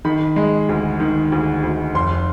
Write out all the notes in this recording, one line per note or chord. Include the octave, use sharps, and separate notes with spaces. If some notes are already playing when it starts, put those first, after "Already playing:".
D#3 B5
G#3
D2
D#3
D2
D2
F1 C6